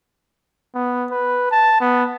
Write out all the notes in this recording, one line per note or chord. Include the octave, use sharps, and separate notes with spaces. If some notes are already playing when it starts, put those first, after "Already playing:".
B3
B4
A5
B3